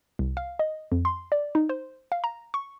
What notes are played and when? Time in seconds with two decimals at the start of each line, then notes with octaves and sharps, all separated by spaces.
0.19 C2
0.37 F5
0.59 D#5
0.92 F2
1.05 C6
1.32 D5
1.55 D#4
1.69 C5
2.12 F5
2.24 A#5
2.54 C#6